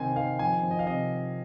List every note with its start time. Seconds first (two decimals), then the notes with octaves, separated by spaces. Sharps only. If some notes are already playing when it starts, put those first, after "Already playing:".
Already playing: C3 D#3 C4 G#5
0.16 D#3 F5
0.39 F3 G#5
0.63 F3
0.71 D#5
0.79 F5
0.86 C3 D#5